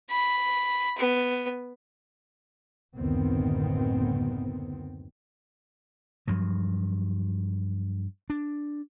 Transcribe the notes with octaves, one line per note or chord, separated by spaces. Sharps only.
B5
B3
F#1 D2 A2 D#3 B3 C4
G2 F3 F#3
D4